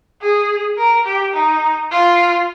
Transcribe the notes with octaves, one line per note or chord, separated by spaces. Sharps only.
G#4
A#4
G4
D#4
F4